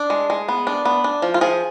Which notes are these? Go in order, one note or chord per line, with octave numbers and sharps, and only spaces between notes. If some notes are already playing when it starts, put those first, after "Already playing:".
Already playing: D4
G#3
G#3
B3
D4
B3
D4
F3
F4
F3 G#4